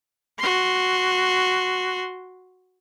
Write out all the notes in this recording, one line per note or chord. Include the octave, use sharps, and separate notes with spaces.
F#4 C6